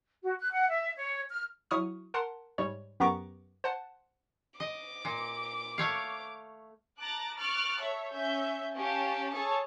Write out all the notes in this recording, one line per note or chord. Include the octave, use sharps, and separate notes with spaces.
F#4
F#6
F#5
E5
C#5
F6
F#3 E4 C#6 D#6 F6
A#4 F#5 A5 C6
G#2 G3 C#5
F#2 B3 G4 A#5 C#6 D6
C5 F#5 A5
D#5 D6
A#2
A3 C#5 F5
A5 A#5 D6 F#6 A6
C#6 D6 F6 F#6 A6
A4 C#5 E5
C#4 E5 G6
C#4 G4 F5 A5
G#4 A4 C#5 A5